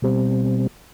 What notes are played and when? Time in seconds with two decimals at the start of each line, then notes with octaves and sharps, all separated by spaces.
0.02 B2 G3 C4